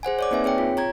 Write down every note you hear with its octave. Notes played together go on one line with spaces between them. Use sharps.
G#4 C5 F#5 G#5
C#5 D5 D6
A#3 C4 D#4 B4 E5 G#5
C4 G#4 C#5 G5
F4
C#5 A#5 G#6